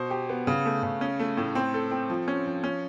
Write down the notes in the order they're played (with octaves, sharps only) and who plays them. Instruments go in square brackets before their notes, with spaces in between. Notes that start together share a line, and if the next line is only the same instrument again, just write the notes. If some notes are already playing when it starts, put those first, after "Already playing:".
Already playing: [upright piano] B2 C5
G4
B3
C#3
A3
C#3
C#4
A3
A2
C4
A4
C4
F3
C#4
F3
C#4